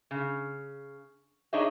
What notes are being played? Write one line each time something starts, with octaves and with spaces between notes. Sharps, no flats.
C#3
D4 D#4 G#4 C#5 D#5 E5